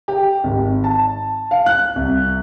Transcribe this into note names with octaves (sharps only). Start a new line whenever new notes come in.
G4
G#1
A5
F5
F#6
C2